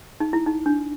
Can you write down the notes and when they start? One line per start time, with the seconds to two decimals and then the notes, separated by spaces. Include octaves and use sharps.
0.20 D#4
0.33 E4
0.46 D#4
0.66 D4